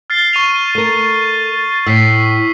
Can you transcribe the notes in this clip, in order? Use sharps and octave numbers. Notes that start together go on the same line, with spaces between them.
F6 A6 C7
C#6 D#7 F7
A3 A#4
A2 E6 B6 C7